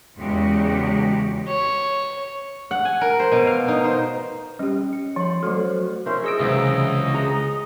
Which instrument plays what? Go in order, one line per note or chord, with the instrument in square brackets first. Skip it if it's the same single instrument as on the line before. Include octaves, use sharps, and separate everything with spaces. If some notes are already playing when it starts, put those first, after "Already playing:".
[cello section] E2 C#3 G#3 F#4 G4 D#5
[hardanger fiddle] C#5
[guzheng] F#5
G#5
A#4
C5
B2
F5
D#4
C5
[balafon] G3 G4 [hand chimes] C#4
[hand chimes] C#7
[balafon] F3 [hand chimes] C#5 C6
[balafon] F#3 A3 A4 [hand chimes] F#4 C5
[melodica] C#4 C5 [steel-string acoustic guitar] E4 A#4
[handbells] G#4 E6 D7 [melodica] D#5
[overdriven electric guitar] C#2 [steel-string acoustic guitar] C3 E3 F#3
[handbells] G#4 [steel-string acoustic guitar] A#5